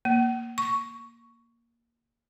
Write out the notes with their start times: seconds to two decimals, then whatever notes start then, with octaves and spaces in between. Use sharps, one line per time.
0.05 A#3
0.58 C#6